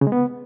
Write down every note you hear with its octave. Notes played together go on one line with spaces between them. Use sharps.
C#3
G#3
B3